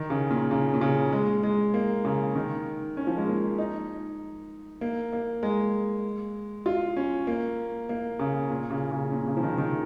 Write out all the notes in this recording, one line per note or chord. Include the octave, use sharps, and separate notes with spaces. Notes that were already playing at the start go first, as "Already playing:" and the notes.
Already playing: D#3
C#3
A#2
C#3
A#2
C#3
G#3
G#3
A#3
C#3
D#3
C#4
F3
G#3
A#3
D#4
A#3
A#3
G#3
F4
C#4
A#3
A#3
C#3
A#2
C#3
C#3
A#2
C#3
F3
D#3
D#3